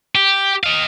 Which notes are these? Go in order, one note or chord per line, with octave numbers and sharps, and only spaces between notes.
G4
D#5 F5